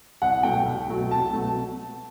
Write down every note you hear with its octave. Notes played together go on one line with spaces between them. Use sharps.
C2 F#5
B2 F#3 A3 G5
C2
B2 F#3 A3
C2 A5
B2 F#3 A3